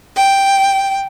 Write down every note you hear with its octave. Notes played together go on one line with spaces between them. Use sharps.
G5